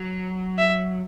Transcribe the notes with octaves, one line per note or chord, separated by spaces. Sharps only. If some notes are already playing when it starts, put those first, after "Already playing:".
Already playing: F#3
E5